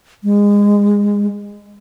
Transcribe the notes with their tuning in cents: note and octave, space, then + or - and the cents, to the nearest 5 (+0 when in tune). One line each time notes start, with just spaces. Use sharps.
G#3 -25